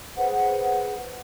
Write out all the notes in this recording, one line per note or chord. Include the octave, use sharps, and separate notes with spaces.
G#4 B4 C5 F#5